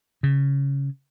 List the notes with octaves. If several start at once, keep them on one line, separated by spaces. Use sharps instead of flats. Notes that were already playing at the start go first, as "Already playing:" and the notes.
C#3